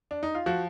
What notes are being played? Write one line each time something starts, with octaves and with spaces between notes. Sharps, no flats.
D4
D#4
F4
F3 F#4